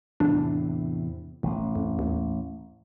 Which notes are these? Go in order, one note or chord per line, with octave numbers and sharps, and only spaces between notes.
E2 A2 C3 D4
E1 A1
F2
D#2